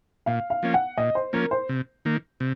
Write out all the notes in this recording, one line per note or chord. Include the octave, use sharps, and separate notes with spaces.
A#2 F5
F5
F3 A#3 C#4
F#5
A#2 D#5
C5
F3 A#3 C#4 A#4
C5
C3
D#3 A#3
C3